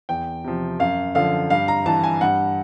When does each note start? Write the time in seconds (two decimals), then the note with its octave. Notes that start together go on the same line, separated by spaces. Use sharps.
0.09 E2 G5
0.44 C3 F3
0.79 F#2 F5
1.15 D3 F3 F5
1.50 G2 F5
1.68 A#5
1.86 E3 A5
2.03 G#5
2.21 G2 F#5